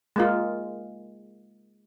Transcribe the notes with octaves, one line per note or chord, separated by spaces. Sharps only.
G#3 A#3 F4